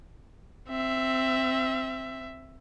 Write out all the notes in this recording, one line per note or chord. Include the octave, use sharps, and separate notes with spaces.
C4 E5